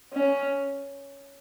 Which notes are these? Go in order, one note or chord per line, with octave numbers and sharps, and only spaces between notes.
C#4